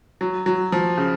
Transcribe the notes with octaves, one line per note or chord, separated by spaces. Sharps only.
F#3
F#3
F3
C#3